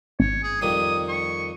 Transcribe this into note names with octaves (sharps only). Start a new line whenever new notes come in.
G#1 C#5
G#4
F2 D#3 G3 D#6
C#6